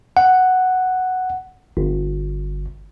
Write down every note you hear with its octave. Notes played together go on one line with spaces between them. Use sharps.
F#5
G1